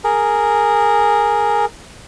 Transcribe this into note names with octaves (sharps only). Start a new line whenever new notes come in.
G#4 A#4